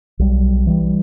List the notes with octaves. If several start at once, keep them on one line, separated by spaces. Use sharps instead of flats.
B1 G3
E3 G3